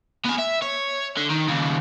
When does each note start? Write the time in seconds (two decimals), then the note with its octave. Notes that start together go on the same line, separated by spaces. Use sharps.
0.25 B3 G#5
0.38 E5
0.62 C#5
1.17 D3
1.30 D#3
1.49 D#2 C#3